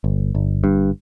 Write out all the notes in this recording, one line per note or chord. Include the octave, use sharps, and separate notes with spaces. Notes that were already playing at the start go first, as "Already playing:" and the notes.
G1
G1
G2